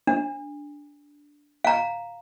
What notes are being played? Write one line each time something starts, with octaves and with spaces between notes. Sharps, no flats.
D4
F5 A#5